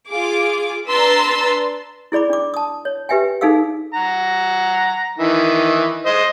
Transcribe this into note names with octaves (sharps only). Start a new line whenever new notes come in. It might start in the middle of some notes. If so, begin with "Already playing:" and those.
F4 G#4 D6
D4 B4 A#5 C6 E6 A6
E4 G#4 D5 B5 D6
D4 D6
A5 D#6
C#5
G4 B4 E5 G5 G#5
D#4 G#4 A4 F5 E6
F#5 A#5
D#3 E3
C5 D#5